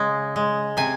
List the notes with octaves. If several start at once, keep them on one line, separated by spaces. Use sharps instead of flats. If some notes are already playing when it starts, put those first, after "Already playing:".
Already playing: C#3 G#3
G#3
C3 G#5